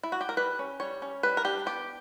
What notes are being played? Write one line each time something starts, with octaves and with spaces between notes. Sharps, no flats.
E4
F#4
G4
A#4
G3 B4
C#4
G3 C#5
C#4
G3 B4
A#4
D4 G4
B3 G4